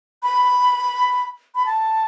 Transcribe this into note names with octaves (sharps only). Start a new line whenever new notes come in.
B5
B5
A5